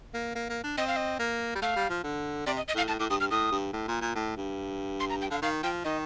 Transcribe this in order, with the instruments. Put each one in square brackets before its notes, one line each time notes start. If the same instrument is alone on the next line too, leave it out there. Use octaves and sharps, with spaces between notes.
[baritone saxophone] A#3
A#3
A#3
D4
[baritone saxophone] C4 [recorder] D#5
[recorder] F5
D#5
[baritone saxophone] A#3
G3
[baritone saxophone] A3 [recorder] F5
[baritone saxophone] G3
F3
D3
[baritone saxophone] C3 [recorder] D5
[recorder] D#5
D#5
[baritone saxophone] A2 [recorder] F5
[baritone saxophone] A2 [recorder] A5
[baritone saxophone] A2 [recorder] D6
[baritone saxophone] G2 [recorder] D#6
[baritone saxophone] G2 [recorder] F6
[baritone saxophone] A2 [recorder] D#6
[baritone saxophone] G2
A2
A#2
A#2
A2
G2
[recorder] C6
A#5
G5
[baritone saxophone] D3 [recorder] F5
[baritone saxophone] D#3 [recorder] F5
[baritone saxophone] F3 [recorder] G5
[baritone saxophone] D#3 [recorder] D#5